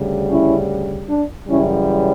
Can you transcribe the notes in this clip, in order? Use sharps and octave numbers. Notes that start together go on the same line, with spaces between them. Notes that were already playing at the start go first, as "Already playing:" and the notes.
Already playing: D2 C#3 G3
C#4 E4
D4
F#2 C#3 E3 G3 C#4 E4